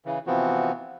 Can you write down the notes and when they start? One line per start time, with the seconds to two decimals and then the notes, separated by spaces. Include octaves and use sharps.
0.06 C#3 E3
0.27 C3 E3 F3 B3 C4 F#4